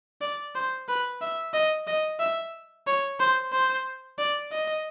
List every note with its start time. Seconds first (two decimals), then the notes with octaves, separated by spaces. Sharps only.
0.21 D5
0.55 C5
0.89 B4
1.21 E5
1.54 D#5
1.87 D#5
2.20 E5
2.87 C#5
3.20 C5
3.52 C5
4.19 D5
4.52 D#5